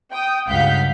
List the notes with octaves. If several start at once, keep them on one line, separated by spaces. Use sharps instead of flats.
G5 D#6
C#2 G2 F5 F#5 G6 B6